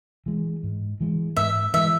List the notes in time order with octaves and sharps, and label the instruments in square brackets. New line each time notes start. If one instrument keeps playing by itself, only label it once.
[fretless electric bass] E3 G#3
G#2
E3 G#3
[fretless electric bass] G#2 [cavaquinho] E5
[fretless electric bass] E3 G#3 [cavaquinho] E5